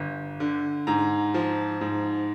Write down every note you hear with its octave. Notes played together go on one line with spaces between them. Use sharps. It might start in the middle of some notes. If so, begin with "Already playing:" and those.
Already playing: G1
D3
G#2 A#5
F3
G#2